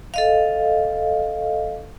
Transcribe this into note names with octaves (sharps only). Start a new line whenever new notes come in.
A4 D#5 F5